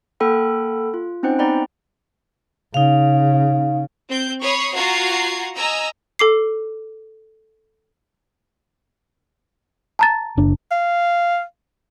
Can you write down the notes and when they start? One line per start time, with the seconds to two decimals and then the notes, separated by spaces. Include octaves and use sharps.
0.20 A#3 A4 F#5 G5 B5 F6
0.94 F4
1.23 C4 C#4 D#4 C5 F#5 G5
1.39 B3 D#4 D5 G5 A#5 B5
2.74 C#3 D#4 F5
4.08 C4 G6
4.41 C#5 B5 C#6 D#6 C7
4.74 F4 F#4 F#5 A#5 G#6 C7
5.56 D#5 G#5 A#5 E6
6.19 A4 D6 C7
9.99 A5 A#5 A6
10.37 F#1 D4
10.71 F5